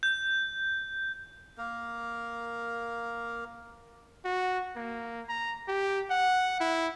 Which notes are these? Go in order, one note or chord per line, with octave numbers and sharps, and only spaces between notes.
G6
A#3 A#4
F#4
A#3
A#5
G4
F#5
E4